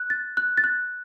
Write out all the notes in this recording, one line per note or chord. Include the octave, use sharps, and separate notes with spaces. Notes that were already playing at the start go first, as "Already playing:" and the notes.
Already playing: F#6
A6
F#6
A6
F#6